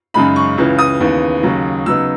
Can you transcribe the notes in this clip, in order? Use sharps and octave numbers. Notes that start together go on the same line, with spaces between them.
F#2 C#3 G#3 D#4 B5
C#6
C#2 C#3 E3
D#6
D#2 C#3 E3 B3
D#2 C#3 F#3
C#3 F#3 B3 D#4 E6